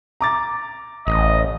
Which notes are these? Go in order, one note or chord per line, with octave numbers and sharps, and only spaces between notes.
A#5 D6 A6
A1 D#5